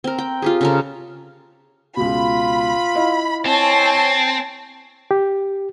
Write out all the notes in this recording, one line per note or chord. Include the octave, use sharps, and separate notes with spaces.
C4 A#4
G5
F4 G4 G#4
C#3 A4 A#4
C#2 B2 F4 B5
E4 D#5 F5
C4 C#5 G#5 A5
G4